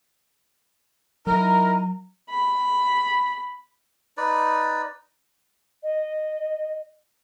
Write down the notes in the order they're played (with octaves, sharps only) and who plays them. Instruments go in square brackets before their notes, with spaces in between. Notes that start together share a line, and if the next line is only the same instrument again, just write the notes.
[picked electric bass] F#3 [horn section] D#4 E4 A#4 [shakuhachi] A#5
[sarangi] B5
[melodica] D#4 B4 D5
[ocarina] D#5